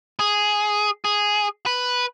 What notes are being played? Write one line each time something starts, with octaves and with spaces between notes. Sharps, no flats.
G#4
G#4
B4